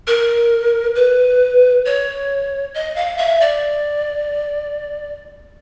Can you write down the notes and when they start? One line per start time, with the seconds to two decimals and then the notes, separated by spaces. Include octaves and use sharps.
0.07 A#4
0.95 B4
1.85 C#5
2.75 D#5
2.96 F5
3.18 E5
3.41 D5